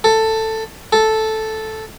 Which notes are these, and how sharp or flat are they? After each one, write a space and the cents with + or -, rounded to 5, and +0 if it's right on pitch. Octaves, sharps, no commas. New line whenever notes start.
A4 +10
A4 -5